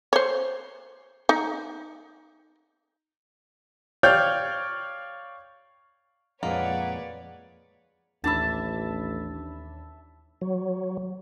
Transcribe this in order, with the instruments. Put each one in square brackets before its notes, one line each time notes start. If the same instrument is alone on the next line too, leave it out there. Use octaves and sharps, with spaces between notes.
[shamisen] C5 C#5
D#4
[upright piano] C#5 D5 F5 G5 F6 G6
[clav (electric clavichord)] F2 A#2 G#3 [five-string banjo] A#3 [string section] B4 C#5 D5 [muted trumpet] F#5
[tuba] A1 [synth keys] D#2 D4 B5 [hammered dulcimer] E5 A5
[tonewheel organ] F#3